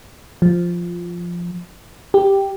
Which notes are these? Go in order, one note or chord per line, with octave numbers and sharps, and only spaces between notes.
F3
G4